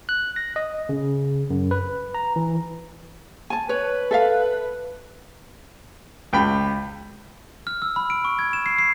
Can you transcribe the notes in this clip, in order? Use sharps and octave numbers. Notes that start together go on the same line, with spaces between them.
F#6
A#6
D#5
C#3
F#2
B4
A#5
E3
G#5 A5
B4 C#5
A4 E5 F5
C#2 G5 B5
F6
E6
B5
D7
C#6
G#6
E7
C7
C7